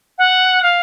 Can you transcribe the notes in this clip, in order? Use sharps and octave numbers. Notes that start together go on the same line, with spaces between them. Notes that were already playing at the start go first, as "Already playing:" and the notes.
F#5
F5